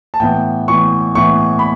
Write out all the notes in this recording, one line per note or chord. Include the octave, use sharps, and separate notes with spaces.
A5
A2 E3 B3 G5
A2 E3 B3 C#6
A2 E3 B3 C#6
B5